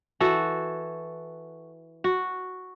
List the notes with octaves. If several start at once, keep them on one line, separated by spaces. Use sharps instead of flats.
E3 F#4 A4
F#4